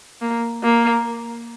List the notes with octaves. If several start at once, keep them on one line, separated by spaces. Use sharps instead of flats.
A#3
A#3